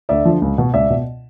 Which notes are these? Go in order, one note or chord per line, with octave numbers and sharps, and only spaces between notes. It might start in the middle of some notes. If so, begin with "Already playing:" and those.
D2 D5 E5
D3 F3
C#2
B2
C#2 D5 E5
B2